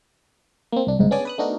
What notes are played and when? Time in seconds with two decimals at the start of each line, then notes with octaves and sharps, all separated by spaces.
0.72 A#3 C4
0.87 C2 D4
0.99 G1 C#2 G#2 D#4
1.11 B3 C#4 D4 G#4 D5 G#5
1.25 B4 D#6 F#6
1.38 A3 B3 D4 D#4 F#4 A#4